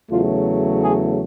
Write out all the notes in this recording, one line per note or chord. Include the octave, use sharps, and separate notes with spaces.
E2 C#3 F#3 A3 F4
G#4